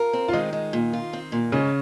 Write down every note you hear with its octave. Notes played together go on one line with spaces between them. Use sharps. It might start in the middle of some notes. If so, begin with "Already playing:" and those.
Already playing: F4 A#4
C4
F4
D#3 G#3 D#4
G#3
A#2
F4
C4
A#2
G#2 C#3 C#4